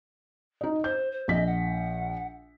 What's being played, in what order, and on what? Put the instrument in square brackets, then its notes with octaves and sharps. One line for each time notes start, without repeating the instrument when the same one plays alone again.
[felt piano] D#4 D#5
[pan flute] C5 [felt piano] G6
[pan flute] C5
[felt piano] A#1 B6 [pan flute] D#5
[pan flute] F#5